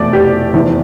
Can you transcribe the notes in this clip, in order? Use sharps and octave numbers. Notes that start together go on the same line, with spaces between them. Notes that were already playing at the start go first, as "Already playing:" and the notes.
Already playing: F1 E2 B2 A3 D5
G4
F1 E2 C3 E3